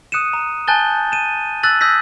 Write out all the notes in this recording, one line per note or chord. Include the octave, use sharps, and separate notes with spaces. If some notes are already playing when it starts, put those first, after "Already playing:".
D#6 F#6 C#7 D#7 E7
A#5
G#5 A5 F#6 G6 A6 G7
D#7 E7
E6 F#6 A6 B6 F#7
D#6 E6 G6 A#6 B6